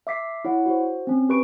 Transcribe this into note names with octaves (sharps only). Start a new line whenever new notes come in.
E5 D6 B6 C7
E4 C#5 F#5
F#4 C5
C4 C#4
G4 B4 C#6 D7